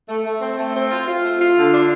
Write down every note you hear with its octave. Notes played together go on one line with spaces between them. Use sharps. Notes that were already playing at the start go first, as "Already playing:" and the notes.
A3
A3
C4
A3
C4
F4
F4
A3
F4
D3
D4